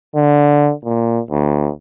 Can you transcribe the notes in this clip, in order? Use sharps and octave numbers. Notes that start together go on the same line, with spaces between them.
D3
A#2
D2